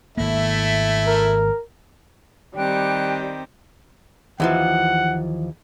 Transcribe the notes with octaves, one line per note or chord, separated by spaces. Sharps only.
G#1 A3 A#3 E4
A#4
D#3 G3 C4 G4 G5 F#6
D#2 E3 F3 F#5